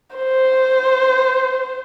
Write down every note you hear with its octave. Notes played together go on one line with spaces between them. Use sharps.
C5